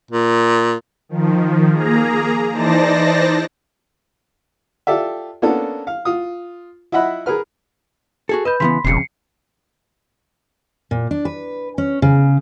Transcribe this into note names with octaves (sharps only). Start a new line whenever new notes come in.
A#2
D#3 F3
A#3 G#4 A#5
E3 D#4 C5 D5 A5 A#6
F4 G4 A4 D5 E5
A#3 B3 C#4 D4 A4
F5
F4 D#6
E4 F4 D#5 E5 F#5 B5
G#4 A#4 B4 F6
F#4 G#4 A4
B4 D#5 B5 G6
C#3 E3 B3 B5 C6 B6
E1 F2 A#2 C#3 C7 C#7
A#2
D4
B4
C#4
C#3